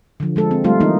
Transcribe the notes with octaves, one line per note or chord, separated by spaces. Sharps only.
D3 F3
F3 G#3 A4
C4
G3 A3 F4
E3 A#3 D#4